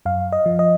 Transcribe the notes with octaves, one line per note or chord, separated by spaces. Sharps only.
F#2 F5
D#5
F3
D#5